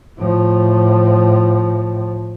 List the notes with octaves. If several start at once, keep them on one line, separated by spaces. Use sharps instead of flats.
A2 F3